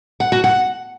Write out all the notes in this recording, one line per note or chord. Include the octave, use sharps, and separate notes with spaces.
F#5
F#4
F#5